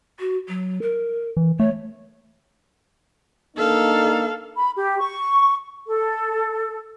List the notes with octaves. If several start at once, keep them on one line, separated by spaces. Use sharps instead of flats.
F#4
F#3
A#4
E3
A3 C#5
A#3 D4 D#4 A4 F5
B5
G4
C#6
A4